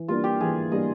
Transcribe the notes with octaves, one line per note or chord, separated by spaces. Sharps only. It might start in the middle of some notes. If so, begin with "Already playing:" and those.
Already playing: E3
G3 A#3 D4 F4
G4
E3 G#4
G3 A#3 D4 D#5